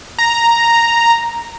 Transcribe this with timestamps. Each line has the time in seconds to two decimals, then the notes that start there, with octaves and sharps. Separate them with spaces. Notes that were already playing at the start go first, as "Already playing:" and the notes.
0.19 A#5